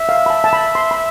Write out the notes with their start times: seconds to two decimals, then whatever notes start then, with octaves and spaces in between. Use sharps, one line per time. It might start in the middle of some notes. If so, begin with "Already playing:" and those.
Already playing: E5
0.09 F5
0.26 B5
0.30 A5
0.44 A5
0.53 B5
0.75 C6
0.91 B5